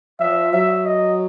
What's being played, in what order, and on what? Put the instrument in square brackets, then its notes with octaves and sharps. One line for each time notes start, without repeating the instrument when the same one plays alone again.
[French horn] F3 [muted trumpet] E5
[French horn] F#3 [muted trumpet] E5
[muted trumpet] D#5